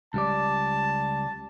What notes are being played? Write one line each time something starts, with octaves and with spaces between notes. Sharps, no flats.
C#2 G3 D5 A5